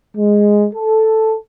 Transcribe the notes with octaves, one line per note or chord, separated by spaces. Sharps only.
G#3
A4